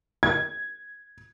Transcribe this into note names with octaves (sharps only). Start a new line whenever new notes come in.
G#6